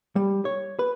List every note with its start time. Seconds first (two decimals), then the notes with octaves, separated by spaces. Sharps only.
0.16 G3
0.45 C#5
0.79 B4